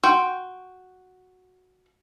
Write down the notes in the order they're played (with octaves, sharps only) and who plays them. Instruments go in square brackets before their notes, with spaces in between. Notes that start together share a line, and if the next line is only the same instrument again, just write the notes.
[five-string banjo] F#4 G5 [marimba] C6